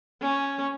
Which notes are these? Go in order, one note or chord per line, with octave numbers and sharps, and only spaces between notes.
C#4